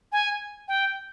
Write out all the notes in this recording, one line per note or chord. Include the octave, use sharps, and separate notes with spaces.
G#5
G5